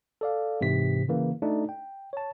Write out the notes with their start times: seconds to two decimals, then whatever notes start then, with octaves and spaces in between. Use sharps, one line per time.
0.21 A4 D5 F5
0.61 G#2 C3 E3 B6
1.09 C#3 E3 A#3
1.42 A3 D4 D#4 F#4
1.69 G5
2.13 C#5 A5